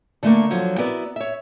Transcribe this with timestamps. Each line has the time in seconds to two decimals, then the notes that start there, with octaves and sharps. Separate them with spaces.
0.23 D3 A3 A#3
0.50 D3 F3 F#3
0.78 B3 E4 F#4 A#4 D5
1.16 C#5 E5